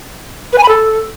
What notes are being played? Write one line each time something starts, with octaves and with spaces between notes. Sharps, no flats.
B4
G#5
B5
A4